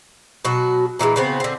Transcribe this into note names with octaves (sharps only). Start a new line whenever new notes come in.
B2 F#3 F#4
A#2 E3 F3 G#3
C#3 B3 C4
D3 C4